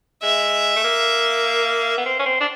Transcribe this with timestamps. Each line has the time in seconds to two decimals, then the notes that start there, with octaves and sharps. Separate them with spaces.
0.22 G#3 E5
0.76 A3
0.84 A#3
1.98 B3
2.06 C4
2.20 C#4
2.26 C4
2.41 D4